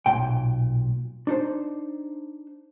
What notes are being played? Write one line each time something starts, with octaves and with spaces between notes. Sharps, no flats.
B1 A#2 G5
D4 D#4 C5